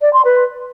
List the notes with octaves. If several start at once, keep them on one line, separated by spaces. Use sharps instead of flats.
D5
C6
B4